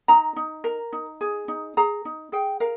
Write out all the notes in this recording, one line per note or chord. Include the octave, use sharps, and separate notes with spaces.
D#4 A#5
D#4
A#4
D#4
G#4
D#4
G#4 A#5
D#4
G#4 G5
A#4 F5